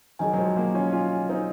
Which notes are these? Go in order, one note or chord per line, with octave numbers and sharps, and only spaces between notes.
D#3 F#3 G#4 D#5 G#5
F#3
F3 G#3
F#3 A#3
C#4 F4
C#4 F4
C4 D#4